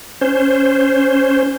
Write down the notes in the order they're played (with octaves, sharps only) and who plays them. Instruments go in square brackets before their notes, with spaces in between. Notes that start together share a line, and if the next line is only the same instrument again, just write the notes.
[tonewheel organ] C#4 C5